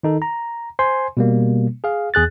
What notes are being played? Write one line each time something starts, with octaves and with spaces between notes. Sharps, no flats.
D#3 D#4 A4
A#5
C5 G#5 C6
B2 G3 A#3
G#4 F5
E2 G#4 F#6 A6